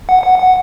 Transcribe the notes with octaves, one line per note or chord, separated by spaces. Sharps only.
F#5
F#5
F#5